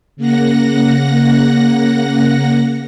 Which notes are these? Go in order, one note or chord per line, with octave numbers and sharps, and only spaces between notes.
C#3 A#3 F#5 A#6